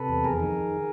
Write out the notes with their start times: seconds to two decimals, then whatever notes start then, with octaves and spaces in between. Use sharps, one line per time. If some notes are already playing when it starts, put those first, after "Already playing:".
Already playing: C3 A4 B4
0.09 E2
0.24 F2 G#4 A#4
0.40 D#3